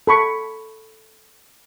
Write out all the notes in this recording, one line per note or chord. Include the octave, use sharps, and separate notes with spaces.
A4 B5 C#6